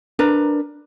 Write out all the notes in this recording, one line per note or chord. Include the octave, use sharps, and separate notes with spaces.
D4 A#4 B4 A#5